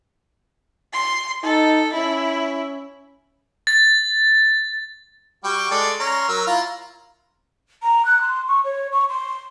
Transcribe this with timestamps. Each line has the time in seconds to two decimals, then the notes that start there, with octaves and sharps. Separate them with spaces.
0.93 C6
1.43 D#4 A4
1.93 C#4 E4
3.67 A6
5.44 G3 F#4 G5
5.71 G#3 A4 D5
6.00 C#4 A#5 C6
6.28 F#3 A#4 E6
6.47 E4 F4 A#5
7.82 A#5
8.05 F#6
8.21 C6
8.48 C#6
8.64 C#5
8.92 C#6
9.09 C6